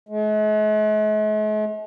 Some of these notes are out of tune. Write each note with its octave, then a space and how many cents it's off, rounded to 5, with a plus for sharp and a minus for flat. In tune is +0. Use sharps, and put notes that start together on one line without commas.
G#3 +45